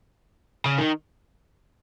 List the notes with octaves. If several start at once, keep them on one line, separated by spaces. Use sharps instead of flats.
C#3
D#3